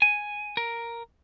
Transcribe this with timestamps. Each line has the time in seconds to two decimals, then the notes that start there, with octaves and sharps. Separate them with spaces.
0.02 G#5
0.57 A#4